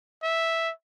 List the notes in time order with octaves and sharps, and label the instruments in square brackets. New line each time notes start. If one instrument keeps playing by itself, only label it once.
[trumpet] E5